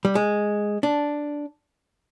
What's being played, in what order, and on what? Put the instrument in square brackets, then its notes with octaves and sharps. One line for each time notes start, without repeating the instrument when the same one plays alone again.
[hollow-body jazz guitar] G3
G#3
D4